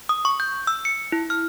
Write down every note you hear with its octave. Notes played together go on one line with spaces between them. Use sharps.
D#6
C#6
G6
E6
C#7
E4
F6